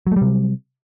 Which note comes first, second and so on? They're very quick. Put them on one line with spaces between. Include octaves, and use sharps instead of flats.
F#3 A3 G3 C3